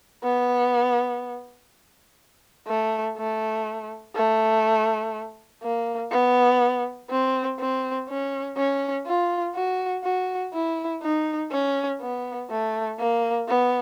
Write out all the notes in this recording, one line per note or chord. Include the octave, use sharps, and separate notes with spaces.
B3
A3
A3
A3
A#3
B3
C4
C4
C#4
C#4
F4
F#4
F#4
E4
D#4
C#4
B3
A3
A#3
B3